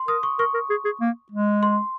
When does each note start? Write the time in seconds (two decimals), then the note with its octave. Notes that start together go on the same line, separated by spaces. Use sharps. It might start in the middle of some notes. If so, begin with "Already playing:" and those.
Already playing: C6
0.08 A#4 D#6
0.23 C#6
0.39 A#4 C#6
0.54 A#4
0.70 G#4
0.85 G#4
1.01 A#3
1.32 G#3
1.63 C6